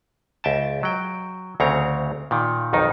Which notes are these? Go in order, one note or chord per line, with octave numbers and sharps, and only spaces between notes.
C#2 E5 G5 A5
F#3 G5
D2 C#3 C4 C#5 A#5
A#2 D#3
B1 F2 D#3 D#4